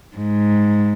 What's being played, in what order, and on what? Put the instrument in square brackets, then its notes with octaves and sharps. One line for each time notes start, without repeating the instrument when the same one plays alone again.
[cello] G#2